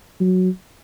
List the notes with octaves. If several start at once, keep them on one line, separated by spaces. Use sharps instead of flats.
F#3